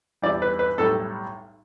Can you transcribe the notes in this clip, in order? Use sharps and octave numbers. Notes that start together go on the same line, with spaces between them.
E2 E3 G3 D5
B4
B4
B1 A2 G3 A4